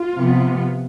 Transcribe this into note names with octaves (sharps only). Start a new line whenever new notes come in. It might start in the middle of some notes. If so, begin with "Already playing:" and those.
Already playing: F4
C3 F3 B3